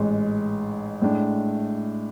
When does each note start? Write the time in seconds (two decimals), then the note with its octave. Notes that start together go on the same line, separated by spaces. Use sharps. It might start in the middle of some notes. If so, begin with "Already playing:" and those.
Already playing: A1 G#2 G#3
1.01 A2 G#3 D4